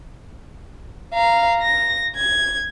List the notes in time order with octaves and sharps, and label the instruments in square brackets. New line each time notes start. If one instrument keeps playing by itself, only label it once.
[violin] F5 A#5
A#6
G#6